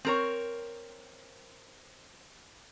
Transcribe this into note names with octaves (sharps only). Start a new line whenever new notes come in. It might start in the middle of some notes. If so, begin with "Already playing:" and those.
C4 A#4 C#5